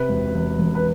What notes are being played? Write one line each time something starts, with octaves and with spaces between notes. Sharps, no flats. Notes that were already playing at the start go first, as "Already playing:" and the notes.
Already playing: C3 B4
E1
E1
E1
B4